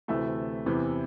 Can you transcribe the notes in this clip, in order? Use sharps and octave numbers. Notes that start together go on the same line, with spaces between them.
D2 C3 E3 A3 E5
E2 C3 E3